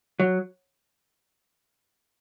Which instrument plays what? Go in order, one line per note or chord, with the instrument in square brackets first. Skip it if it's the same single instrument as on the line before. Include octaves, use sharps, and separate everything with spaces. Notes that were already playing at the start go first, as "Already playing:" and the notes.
[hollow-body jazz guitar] F#3